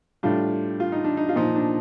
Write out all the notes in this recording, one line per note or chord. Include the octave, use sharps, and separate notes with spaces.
A2 G3 D4 F4
F4
D#4
D4
D#4
F4
A#2 F3 D#4
D4